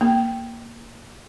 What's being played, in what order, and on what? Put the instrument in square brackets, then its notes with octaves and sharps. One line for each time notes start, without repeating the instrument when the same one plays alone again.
[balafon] A#3